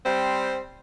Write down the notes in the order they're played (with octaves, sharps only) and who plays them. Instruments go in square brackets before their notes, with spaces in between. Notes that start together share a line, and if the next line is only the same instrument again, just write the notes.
[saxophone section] G3 C4 C5